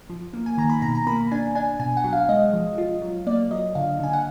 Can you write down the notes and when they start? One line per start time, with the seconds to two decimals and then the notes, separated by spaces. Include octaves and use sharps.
0.10 F3
0.33 A#3
0.46 G#5
0.58 D#3 A#5
0.70 B5
0.82 B2 A#5
0.95 A#5
1.07 A#3 B5
1.31 D4 G#5
1.55 D4 G#5
1.79 B2 G#5
1.97 F#5
2.04 F#3
2.13 F5
2.29 G#3 D#5
2.53 F3
2.78 F4
3.02 F#3
3.27 A#3 D5
3.51 F#3 D#5
3.75 D3 F5
3.99 D3 G#5
4.13 F#5